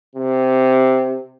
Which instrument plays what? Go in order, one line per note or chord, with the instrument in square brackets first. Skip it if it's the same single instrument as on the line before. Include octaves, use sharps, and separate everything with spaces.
[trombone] C3